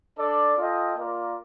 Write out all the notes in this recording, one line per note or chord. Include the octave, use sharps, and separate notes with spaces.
D4 A4 D5
F4 A4 D#5 G5
A#3 F4 A#4 D5